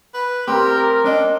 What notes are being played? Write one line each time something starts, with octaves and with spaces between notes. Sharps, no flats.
B4
C4 G4 A#4
C#4 D4 D#5